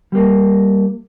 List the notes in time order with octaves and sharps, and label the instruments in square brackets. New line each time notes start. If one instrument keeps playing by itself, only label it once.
[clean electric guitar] G3 A#3